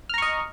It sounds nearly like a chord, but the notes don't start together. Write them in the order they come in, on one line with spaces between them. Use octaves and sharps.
F6 A#5 C#6 D#5